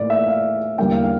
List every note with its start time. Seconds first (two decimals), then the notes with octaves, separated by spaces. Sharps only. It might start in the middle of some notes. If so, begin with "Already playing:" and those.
Already playing: A2 E3 A#3 E4 D5
0.10 E5
0.27 F5
0.78 E2 D3 G3 A#3 C#4 G5
0.91 F5
1.04 F5